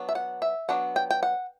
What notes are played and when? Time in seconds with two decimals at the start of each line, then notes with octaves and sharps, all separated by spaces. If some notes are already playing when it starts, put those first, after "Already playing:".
Already playing: F#3 B3 D4
0.09 E5
0.15 F#5
0.42 E5
0.69 F#3 B3 D4 F#5
0.96 G5
1.11 G5
1.23 F#5